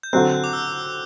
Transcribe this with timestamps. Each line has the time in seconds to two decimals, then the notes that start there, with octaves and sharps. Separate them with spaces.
0.03 G6
0.13 D3 F#3 C4 F#6
0.44 D6
0.53 E6